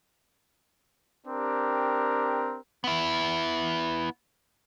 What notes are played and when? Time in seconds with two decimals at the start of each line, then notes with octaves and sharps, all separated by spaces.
1.27 C4 D4 G4 A#4
2.84 B3 E4